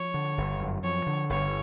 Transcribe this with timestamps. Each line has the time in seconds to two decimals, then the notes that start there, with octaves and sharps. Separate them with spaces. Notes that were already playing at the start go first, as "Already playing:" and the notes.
Already playing: F3 C#5
0.14 D3
0.38 G1
0.60 F#2
0.84 F3 C#5
1.07 D3
1.30 G1 C#5